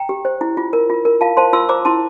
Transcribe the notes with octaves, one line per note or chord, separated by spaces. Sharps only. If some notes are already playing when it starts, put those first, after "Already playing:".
Already playing: G5 A#5
G4
C5
E4
F4
A#4
F4
A#4
F4 F5 A5
C5 A5 C6
F4 C6 E6
C5 A#5 D6
E4 A5 C6